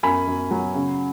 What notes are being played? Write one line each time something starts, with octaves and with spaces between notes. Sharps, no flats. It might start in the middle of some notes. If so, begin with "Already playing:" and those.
F#2 G#5 B5
F#2
F#3
C#3